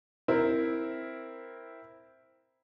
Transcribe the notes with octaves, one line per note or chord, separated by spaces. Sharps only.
C4 E4 A#4